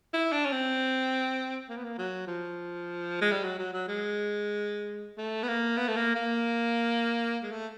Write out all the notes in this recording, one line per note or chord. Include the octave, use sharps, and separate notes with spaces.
E4
D4
C#4
C4
A#3
B3
A#3
F#3
F3
G#3
G3
F#3
F#3
F#3
G#3
A3
B3
A#3
B3
A3
A#3
A#3
G#3
A3